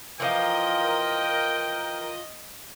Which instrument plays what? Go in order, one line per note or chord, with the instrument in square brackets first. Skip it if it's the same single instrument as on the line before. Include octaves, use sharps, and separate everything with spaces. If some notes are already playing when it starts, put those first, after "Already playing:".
[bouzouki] E3 F3 F4 [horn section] A#4 G5 [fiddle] D#5